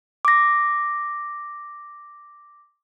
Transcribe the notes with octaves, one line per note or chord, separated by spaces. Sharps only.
D6 A#6